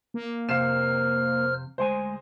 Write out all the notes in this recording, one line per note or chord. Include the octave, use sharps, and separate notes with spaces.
A#3
F2 C3 C5 F5 F6 C7 E7
D2 G#3 C5 G#5